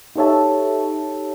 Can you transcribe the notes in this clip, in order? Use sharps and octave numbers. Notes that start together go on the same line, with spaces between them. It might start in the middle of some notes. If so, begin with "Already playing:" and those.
D#4 G4 A4 C#5 E5 A5